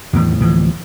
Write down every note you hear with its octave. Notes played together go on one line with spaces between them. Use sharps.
E2 A2 D#3
D2 A2 E3 F3